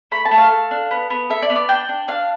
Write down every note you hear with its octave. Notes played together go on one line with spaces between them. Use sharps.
A3 B5
A5
A3
F5
A3
D4
B3
B3
A4 E5
D5
B3
D5
D4 G5
D4
D4 F5